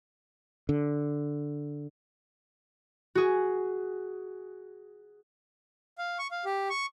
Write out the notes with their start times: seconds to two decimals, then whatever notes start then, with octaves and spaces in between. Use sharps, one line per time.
0.69 D3
3.15 F#4 G#4
5.98 F5
6.18 C#6
6.31 F5
6.45 G4
6.70 C#6